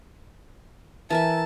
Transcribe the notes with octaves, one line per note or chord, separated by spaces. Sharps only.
E3 A#4 E5 A5